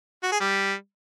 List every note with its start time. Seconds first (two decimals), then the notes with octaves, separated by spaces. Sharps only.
0.23 F#4
0.32 G#4
0.40 G3